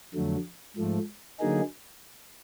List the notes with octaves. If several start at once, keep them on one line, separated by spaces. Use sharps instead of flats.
F2 D3 F#3 A3
G#2 F3 A3
D3 F#3 A#3 D#4 G#4